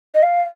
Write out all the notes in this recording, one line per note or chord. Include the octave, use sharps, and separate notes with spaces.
D#5
F5